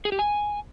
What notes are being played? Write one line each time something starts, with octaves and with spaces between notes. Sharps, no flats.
G#4
G4
G#5